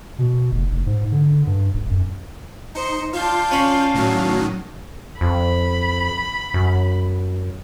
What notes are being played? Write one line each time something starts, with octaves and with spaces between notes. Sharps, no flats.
B2
F1
F1
G#2
D3
G2
D#1
F#2
D#4 C5 C#7
D4 F4 F5 G6
C#4 B5
A2 D#3 F#3
F2 B5
F#2